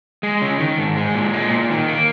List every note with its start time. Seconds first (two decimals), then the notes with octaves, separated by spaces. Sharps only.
0.23 G#3
0.41 C#3
0.60 D#3
0.78 G#2
0.97 G#3
1.14 A#2
1.33 G#3
1.51 A#2
1.70 D#3
1.88 A#3